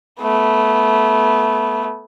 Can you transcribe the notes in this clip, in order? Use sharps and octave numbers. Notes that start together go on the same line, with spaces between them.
A3 B3